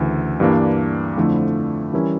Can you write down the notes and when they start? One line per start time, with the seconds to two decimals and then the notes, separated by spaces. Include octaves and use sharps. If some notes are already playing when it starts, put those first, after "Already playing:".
Already playing: D2 C#3 E3
0.40 G2 E3 G3 A#3 D4
1.17 F2 D3 F3 A3 E4
1.93 E3 G3 C#4 E4 A#4